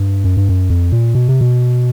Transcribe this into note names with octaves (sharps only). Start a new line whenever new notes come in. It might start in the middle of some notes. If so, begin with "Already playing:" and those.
Already playing: G2
F#2
G2
F#2
F2
A#2
B2
C3
B2